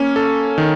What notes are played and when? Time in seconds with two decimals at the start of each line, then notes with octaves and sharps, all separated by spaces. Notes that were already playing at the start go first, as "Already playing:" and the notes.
Already playing: A#3 C#4
0.16 A4
0.58 D#3